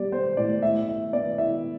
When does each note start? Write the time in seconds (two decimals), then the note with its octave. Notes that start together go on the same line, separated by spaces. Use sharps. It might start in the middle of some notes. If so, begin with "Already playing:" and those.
Already playing: G3 B3 D5
0.12 B3 C5
0.37 A2 D5
0.62 A2 E5
0.88 E4 E5
1.13 B3 D5
1.38 E4 E5